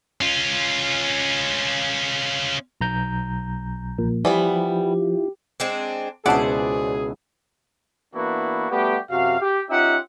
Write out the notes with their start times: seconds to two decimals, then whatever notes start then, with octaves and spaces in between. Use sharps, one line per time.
0.21 C#4 F4
2.81 B1 A#5 G6
3.98 A#2 F3 A#3
4.25 E3 F3 G3 B3 E4 F4 G4
5.60 G#3 C4 D4
6.26 C#2 B2 E4 G#4 C5 D5 F#5 A5
8.14 E3 A#3 B3 D4 E4 F#4
8.70 G3 A3 B3 F#4 G4
9.10 F#2 C3 F#4 F5
9.40 G4
9.69 C#4 D#4 F4 G4 E5 F#5